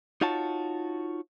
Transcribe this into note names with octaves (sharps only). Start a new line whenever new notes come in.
D#4 F4 F#4 C#5 A5